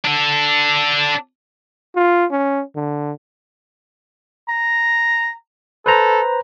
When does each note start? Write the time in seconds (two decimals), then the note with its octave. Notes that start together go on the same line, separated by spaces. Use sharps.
0.04 D4 A4
1.96 F4
2.31 C#4
2.76 D3
4.49 A#5
5.86 A4 B4 C5 A#5